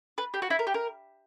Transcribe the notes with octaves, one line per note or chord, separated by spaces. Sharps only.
B4
G4
F#4
E4
A#4
G4
A#4